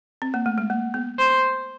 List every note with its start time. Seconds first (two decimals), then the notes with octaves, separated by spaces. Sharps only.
0.22 C4
0.34 A#3
0.46 A3
0.58 G#3
0.70 A#3
0.94 B3
1.19 C5